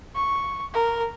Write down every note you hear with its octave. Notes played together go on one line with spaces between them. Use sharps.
C#6
A#4